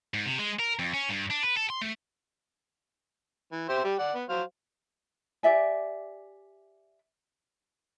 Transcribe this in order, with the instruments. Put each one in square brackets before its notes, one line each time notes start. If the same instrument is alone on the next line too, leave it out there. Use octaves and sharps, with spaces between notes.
[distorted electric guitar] G#2
C3
G#3
A#4
F2
C#4
G2
D4
B4
A4
C6
A3
[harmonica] E3
G4 C5 E5
G3 G4
D5 F#5
B3
F#3 C5 F5
[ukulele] G4 D5 E5 G#5